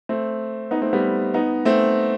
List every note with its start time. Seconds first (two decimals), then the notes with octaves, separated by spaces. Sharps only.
0.09 A3 C4
0.71 B3 D#4
0.81 A3 C4
0.93 G3 B3
1.34 B3 D#4
1.65 A3 C4